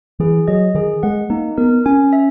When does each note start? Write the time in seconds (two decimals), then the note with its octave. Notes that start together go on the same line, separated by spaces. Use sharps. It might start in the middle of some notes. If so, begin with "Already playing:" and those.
0.20 E3 G#4
0.48 F#3 D#5
0.75 D#3 G#4
1.03 G#3 F#5
1.30 A#3 D#4
1.58 B3 A#4
1.86 C#4 G#5
2.13 E5